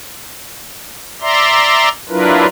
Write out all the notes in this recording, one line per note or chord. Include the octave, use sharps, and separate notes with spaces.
D5 E5 A#5 C6
F#3 D4 E4 F4 A#4 B4